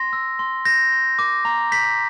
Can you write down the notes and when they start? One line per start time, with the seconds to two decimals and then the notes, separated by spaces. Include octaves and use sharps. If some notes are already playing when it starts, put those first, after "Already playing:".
Already playing: C6 A#6
0.13 E6
0.39 C6
0.65 G6 A#6
0.92 C6
1.19 D6
1.45 A#5
1.72 G6 B6